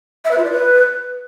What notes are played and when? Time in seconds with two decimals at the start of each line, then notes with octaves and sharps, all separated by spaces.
0.25 E5
0.31 B4
0.38 F4
0.45 D5
0.51 B4